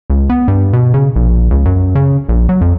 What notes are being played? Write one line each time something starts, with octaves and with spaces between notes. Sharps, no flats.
C#2
B3
G2
B2
C#3
A#1
C#2
F#2
C#3
A#1
F#3
F2